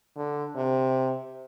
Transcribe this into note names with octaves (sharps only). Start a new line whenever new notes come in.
D3
C3